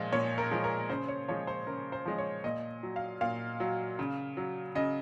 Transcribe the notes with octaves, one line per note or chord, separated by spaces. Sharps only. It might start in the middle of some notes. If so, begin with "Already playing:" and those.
Already playing: A#2 F3 G#3
A#2 C#5
A#4
F3 G#3
A#4
C#3 C5
C#5
F3 G#3 C#5
C5
C#3 A#4
C5
F3 G#3
C#5
A#2 D#5
F#3
F5
A#2 F5
F#3
C#3
F#3
C#3 D#5